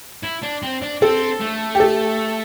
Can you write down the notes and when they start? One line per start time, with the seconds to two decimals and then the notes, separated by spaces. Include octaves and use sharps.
0.24 E4
0.43 D4
0.63 C4
0.82 D4
1.02 C4 A4
1.41 A3
1.75 G4
1.80 A4